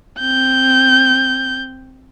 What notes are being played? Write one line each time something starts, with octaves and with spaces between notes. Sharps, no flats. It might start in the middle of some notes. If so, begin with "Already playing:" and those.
C4 G6